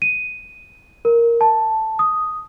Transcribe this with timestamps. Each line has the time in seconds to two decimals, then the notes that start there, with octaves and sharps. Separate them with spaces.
0.02 D#7
1.05 A#4
1.41 A5
1.99 D#6